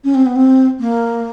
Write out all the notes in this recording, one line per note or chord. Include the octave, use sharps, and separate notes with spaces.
C#4
C4
B3
C4
A#3